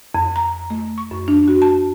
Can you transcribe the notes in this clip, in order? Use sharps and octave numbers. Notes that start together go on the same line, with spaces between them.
F2
A#5
A3
C#6
F#2
D4
F#4
A5